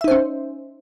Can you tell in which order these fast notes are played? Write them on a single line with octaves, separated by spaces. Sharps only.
E5 D#4 C5 C#4